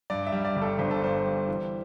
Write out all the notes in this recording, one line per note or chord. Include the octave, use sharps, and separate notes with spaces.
G2 D5
E5
G3
D5
G1
A4
G1 C5
A4
G2 C5
G3
E3